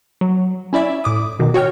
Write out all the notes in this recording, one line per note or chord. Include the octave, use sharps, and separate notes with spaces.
F#3
C#4 E4 D5 E5 B5
A2 D6 D#6
B2 D#3
F#4 C#5 G5 F6